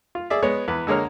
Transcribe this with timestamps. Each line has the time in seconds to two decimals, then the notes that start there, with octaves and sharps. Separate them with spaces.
0.15 F4
0.30 G#4 D5 E5
0.43 G#3 B3 C#5
0.68 E2 B4
0.87 D3 G#3 A#3 C#5 F6